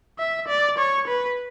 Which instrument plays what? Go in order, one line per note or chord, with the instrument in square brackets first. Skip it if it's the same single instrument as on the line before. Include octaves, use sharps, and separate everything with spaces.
[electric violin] E5
D5
C#5
B4